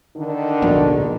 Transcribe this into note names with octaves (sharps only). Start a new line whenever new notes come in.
D3 D#3
D1 A#1 B2